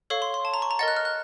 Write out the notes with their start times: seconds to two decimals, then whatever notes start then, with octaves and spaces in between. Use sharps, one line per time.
0.10 A4 C#5 F5 C#6
0.22 C6
0.34 C6
0.45 A5
0.54 A#5
0.62 C#6
0.71 A#5
0.79 A#4 D#5 F#5 A6
0.88 F#6
0.97 F6
1.05 F#6